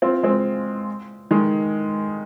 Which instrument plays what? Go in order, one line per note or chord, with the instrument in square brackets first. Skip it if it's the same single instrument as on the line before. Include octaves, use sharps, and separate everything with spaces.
[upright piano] C4 F4
G#3 C4
D#3 G#3